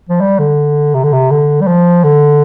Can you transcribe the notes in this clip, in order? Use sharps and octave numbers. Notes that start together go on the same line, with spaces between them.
F3
G3
D3
C3
D3
C3
D3
G3
F3
D3